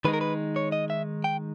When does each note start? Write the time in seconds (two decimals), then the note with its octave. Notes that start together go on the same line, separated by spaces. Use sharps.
0.05 D#3 G#3 D#4 B4
0.13 A#4
0.21 B4
0.56 C#5
0.72 D#5
0.90 E5
1.24 G5